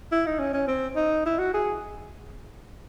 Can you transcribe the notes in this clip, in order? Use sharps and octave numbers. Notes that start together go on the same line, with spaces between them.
E4
D#4
C#4
C#4
C4
D#4
E4
F#4
G#4